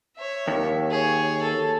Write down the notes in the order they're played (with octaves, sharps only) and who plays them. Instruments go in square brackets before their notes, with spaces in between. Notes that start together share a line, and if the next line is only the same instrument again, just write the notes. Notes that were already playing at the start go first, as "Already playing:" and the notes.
[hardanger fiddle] C#5 E5
[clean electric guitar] D#2
[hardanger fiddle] G#4 C#5
A4